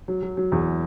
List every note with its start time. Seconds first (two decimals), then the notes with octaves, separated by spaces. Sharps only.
0.08 F#3
0.22 F#3
0.37 F#3
0.52 E2